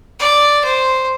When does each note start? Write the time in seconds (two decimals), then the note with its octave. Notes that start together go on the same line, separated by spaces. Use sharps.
0.19 D5
0.65 C5